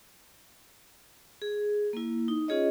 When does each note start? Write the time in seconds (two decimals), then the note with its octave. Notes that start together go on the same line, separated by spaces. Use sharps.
1.42 G#4
1.93 A#3 E4
2.28 D#4
2.48 C#4 F4 G#4 C#5 D#5